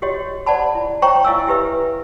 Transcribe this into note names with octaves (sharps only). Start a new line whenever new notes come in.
F#4 G4 C#5 D#5
C5 D5 F#5 A5 B5
E4
C5 C#5 G5 A#5 C#6
E4 D#5 F5 G#5 E6
E4 G4 B4 E5